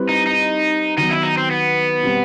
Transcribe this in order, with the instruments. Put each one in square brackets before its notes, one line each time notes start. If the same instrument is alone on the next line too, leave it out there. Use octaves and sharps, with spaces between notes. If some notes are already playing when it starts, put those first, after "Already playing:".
Already playing: [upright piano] G3 C4 E4 B4
[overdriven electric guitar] D#4
D#4
[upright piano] D#3 F#3 B3 [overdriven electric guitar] D#4
[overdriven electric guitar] E4
D#4
C4
B3
[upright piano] B2 G3 C4